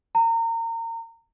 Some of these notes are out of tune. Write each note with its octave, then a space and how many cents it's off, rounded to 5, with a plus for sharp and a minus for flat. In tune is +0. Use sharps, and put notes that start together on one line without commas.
A#5 -30